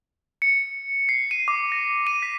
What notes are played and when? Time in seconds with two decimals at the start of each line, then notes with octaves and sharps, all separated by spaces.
0.42 C#7
1.09 C7
1.31 D#7
1.48 D6
1.72 A#6
2.07 D#7
2.22 B6